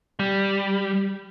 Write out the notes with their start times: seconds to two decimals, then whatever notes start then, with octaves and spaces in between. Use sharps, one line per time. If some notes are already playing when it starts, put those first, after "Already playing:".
0.19 G3